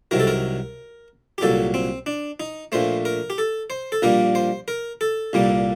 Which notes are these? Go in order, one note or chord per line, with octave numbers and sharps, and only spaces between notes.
C2 C3 D#3 F#3 A#4
A4
A#4
G4
C2 A#2 F#3 A4
C4
D4
D#4
A#1 A#2 A3 C5
A#4
G4
A4
C5
A4
A#1 A#2 G3 A#3 A#4
C5
A#4
A4
C2 A#2 G3 A#3